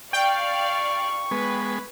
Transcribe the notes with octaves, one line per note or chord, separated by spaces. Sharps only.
D5 F5 G5 C#6
G#3 B3 B4